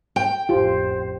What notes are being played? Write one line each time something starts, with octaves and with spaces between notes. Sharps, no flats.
G5
A1 F2 F4 G4 C5